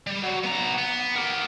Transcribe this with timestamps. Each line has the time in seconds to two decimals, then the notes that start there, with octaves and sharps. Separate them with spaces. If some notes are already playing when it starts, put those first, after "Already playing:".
0.07 G3
0.23 F#3
0.44 B3 A#5
0.78 B3
1.16 G4 A#4